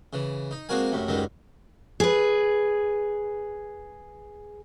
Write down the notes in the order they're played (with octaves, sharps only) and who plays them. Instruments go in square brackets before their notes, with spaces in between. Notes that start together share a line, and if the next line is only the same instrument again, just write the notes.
[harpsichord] C#3 E3
D#4
G#3 A#3 C4 F#4 A#4 G#5
F#2 A2 G3
C#2 F#2 D#3 G3 G#3
[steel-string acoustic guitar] G#4 B4